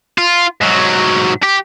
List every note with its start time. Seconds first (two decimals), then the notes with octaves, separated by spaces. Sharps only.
0.18 F4
0.61 G#2 F#3
1.43 G4